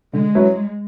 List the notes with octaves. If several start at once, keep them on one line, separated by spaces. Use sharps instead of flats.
D3 G#3
F#3 C#4 E4 B4